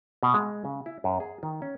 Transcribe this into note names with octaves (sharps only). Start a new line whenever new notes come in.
B2
G#3
C#3
E4
F#2
G#4
D#3
C#4